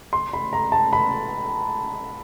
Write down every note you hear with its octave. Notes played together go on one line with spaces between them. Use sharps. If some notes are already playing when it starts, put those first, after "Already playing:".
C6
B5
A#5
A5
B5